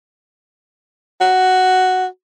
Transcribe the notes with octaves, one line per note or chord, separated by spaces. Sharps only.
F#4